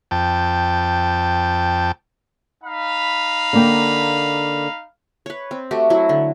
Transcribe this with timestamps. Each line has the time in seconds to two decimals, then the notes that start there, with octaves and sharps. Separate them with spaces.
0.11 F2 G5 A5
2.64 D#4 F5 B5
3.53 D3 A#3 G5
5.26 B4 C#5
5.51 C4
5.71 A3 F#4 G4
5.90 F#3 E4 F#4
6.09 D3